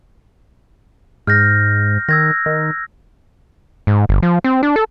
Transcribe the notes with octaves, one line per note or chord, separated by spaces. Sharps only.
G#2 F6 G6 A#6
D#3 E6 G#6 A#6
D#3
G#2
G1
F3
C4
D4
A4